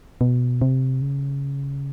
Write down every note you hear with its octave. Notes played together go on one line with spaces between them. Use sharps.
B2
C3
C#3